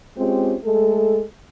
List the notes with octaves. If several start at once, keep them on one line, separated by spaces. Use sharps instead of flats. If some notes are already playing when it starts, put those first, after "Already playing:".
G#3 C4 C#4 F4 G4
G#3 A3 A4